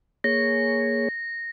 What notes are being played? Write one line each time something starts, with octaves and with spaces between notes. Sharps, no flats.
A#3 G#4 C#5 A#6